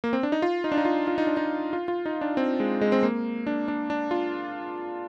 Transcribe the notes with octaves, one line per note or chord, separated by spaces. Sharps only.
A#3
C4
D4
D#4
F4
D#4
D4
D#4
F4
F4
D#4
D4
D#4
F4
F4
D#4
D4
C4
G#3
G#3
C4
A#3
D4
D4
D4
F4